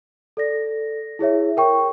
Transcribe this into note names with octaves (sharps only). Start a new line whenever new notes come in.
A4 D5 A#6
E4 G#4 C#5 E5
A#4 G5 C#6